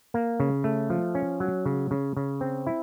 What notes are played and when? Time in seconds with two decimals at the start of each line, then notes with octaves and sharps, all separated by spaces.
0.14 A#3
0.40 C#3
0.64 A3
0.90 F3
1.15 C#4
1.40 F#3
1.66 C#3
1.91 C#3
2.17 C#3
2.41 C4
2.67 E4